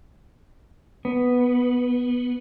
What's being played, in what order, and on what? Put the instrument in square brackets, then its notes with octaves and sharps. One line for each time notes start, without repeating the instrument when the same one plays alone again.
[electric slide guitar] B3